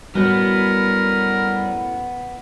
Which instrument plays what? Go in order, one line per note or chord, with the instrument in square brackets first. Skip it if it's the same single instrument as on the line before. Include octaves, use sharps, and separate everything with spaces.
[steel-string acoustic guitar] F#2 A2 [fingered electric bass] G3 [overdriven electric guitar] B3 [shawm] A#4